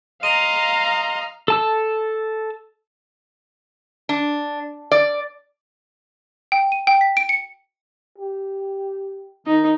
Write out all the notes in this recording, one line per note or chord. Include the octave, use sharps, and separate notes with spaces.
D#5 F5 A#5 C6 D#7 F7
A4 A5 E6
D4
D5
G5
D#7
G5
B6
D7
C#7
G4
D#3 D#4